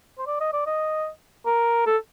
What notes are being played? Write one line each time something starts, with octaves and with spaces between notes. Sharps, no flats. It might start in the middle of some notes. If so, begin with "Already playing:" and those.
C5
D5
D#5
D5
D#5
A#4
A4